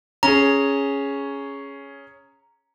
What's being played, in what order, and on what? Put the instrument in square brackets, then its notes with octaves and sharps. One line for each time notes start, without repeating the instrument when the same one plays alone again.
[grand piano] C#4 G#4 [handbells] A#5